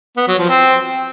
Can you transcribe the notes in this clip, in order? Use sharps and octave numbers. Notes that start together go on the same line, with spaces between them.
B3
F#3
F3
C4